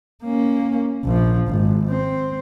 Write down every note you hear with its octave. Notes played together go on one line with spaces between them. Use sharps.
A#3 C#4
A#1 F3
G#1
C4